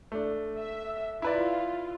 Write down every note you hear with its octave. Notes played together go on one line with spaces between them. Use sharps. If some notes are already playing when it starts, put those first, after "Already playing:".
A3 D4
E5
E4 F4 B4 D5